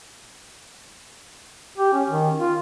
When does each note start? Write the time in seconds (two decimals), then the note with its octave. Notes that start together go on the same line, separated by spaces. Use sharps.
1.78 G4
1.93 C#4
2.10 D#3
2.40 F4